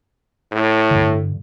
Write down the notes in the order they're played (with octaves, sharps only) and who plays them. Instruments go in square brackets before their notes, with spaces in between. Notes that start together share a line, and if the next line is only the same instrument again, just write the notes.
[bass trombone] A2
[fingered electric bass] G2 D3